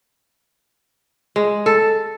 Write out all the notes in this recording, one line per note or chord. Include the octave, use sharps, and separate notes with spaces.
G#3
A4